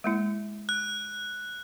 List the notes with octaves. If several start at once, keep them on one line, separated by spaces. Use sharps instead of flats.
G#3 A#3 E4
F#6